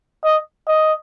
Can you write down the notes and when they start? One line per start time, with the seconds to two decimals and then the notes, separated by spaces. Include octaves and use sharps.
0.24 D#5
0.67 D#5